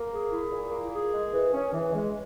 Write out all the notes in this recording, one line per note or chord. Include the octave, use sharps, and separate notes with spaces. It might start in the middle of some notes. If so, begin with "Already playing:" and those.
Already playing: A#3
G#4
E4
A#2
A#3
G#4
G#3
E3
C#4
E3
G#3